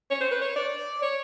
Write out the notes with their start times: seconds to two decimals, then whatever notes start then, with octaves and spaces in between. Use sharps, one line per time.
0.11 C#5
0.21 C5
0.31 B4
0.41 C#5
0.56 D5
1.02 C#5